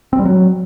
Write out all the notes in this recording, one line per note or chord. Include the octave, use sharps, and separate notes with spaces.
C4
G3
F#3